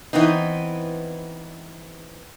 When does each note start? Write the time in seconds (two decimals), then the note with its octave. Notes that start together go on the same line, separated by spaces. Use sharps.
0.13 E3 B3 C4 D#4